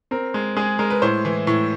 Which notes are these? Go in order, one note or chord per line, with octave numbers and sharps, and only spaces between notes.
C4 A#4
G#3
G#3 G#4
G#3 A#4
B4
A2 C5
E3
A2